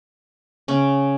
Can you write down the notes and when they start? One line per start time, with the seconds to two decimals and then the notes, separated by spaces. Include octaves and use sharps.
0.68 C#3 C#4